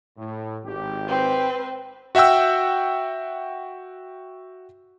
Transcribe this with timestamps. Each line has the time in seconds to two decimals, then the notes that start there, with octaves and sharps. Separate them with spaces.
0.17 A2
0.65 G#1 G4
1.08 C4 B4
2.15 F#4 E5 F#5 G5 E6